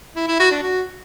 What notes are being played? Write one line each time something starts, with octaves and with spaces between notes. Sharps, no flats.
E4
E4
F#4
D4
F#4